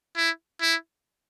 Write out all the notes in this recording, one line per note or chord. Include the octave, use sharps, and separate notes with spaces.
E4
E4